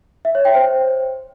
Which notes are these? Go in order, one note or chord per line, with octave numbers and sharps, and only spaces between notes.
E5
C#5
G5
C5